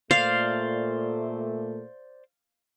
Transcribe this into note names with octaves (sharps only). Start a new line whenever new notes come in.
A#2 A3 C5 D5 F5